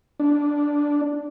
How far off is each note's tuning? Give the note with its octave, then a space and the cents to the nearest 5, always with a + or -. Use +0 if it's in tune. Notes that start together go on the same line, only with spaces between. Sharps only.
D4 -5